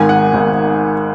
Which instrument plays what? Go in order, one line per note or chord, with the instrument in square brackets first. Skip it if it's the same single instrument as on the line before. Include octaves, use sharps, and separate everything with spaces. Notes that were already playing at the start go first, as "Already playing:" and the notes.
Already playing: [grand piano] G#1 G#2 D#3 G#5
F#5
G#1 G#2 D#3